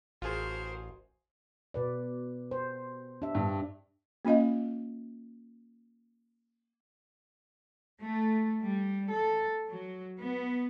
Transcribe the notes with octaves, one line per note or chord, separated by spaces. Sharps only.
A1 F4 F#4 G#4 A#4 C5
B2 B4 D5
C5
D4 G4 E5
G2
A#3 C#4 F4 D#5 F5
A3
G3
A4
F#3
B3